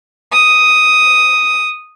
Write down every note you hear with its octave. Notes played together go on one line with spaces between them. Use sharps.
D#6